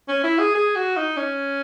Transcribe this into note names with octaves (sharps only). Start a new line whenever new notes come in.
C#4
E4
G#4
G#4
F#4
D#4
C#4